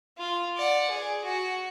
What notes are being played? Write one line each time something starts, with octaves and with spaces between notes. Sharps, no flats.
F4
D5 F#5
G#4
F#4